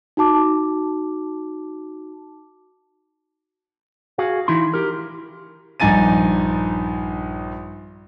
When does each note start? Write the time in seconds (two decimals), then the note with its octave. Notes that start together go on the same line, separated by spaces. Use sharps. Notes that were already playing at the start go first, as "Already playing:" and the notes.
0.17 D#4 F#4 A5 D6
4.18 F#4 G#4 F5
4.48 E3 D#4 E4 C6
4.74 G4 A#4
5.80 A#1 G2 D#4 G#5 A6 D#7